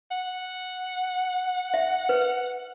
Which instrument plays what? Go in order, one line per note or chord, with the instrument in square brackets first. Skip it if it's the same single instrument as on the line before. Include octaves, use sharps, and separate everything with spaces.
[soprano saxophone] F#5
[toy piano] E5
B4